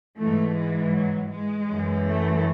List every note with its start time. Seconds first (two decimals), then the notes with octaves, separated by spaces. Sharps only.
0.18 G#2 E3 A3
0.55 G#3
0.93 F#3
1.31 G#3
1.69 F#2 E3
2.07 A3